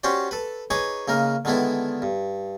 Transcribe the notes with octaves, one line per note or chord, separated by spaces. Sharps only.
C#4 F#4 G4 C5 D5
A4 B4
D#4 G#4 B4 C#5 G#5 D6
C#3 A#3 D#4 A#4
D3 D#3 G#3 B3 D4 E4
G2